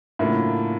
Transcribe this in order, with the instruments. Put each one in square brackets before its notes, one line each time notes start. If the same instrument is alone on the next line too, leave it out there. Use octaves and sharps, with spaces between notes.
[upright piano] A2 [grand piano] C#3 F#3 A#3 D4 F4